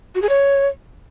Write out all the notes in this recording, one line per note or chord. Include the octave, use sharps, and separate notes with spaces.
F#4
G#4
C#5